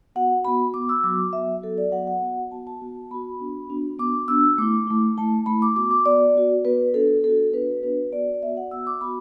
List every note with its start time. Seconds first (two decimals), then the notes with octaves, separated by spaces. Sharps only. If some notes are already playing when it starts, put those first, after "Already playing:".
0.15 B3 F#4 F#5
0.45 B3 F#4 B5
0.74 B3 F#4 D6
0.89 E6
1.03 F#3 B3 F#4 D6
1.33 F#3 B3 F#4 E5
1.62 F#3 B3 F#4 A4
1.78 D5
1.92 F#3 B3 F#4 F#5
2.07 F#5
2.22 B3 F#4
2.51 B3 F#4 A5
2.67 A5
2.81 B3 F#4
3.11 B3 F#4 B5
3.40 B3 D4 F#4
3.70 B3 D4 F#4
3.99 B3 D4 F#4 D6
4.28 B3 D4 F#4 E6
4.58 A3 E4 D6
4.87 A3 E4
5.17 A3 E4 A5
5.46 A3 E4 B5
5.62 D6
5.76 B3 F#4 D6
5.91 D6
6.05 B3 F#4 D5
6.35 B3 F#4
6.65 B3 F#4 B4
6.94 B3 D4 F#4 A4
7.24 B3 D4 F#4 A4
7.53 B3 D4 F#4 B4
7.82 B3 D4 F#4 B4
8.12 B3 F#4 D5
8.34 D5
8.42 B3 F#4 E5
8.57 F#5
8.71 B3 F#4 E6
8.87 D6
9.01 B3 F#4 B5